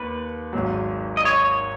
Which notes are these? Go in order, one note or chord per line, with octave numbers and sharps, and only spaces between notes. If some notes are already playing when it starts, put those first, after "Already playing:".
Already playing: D#2 B4
G#1 G#2 F#3
D#5
C#5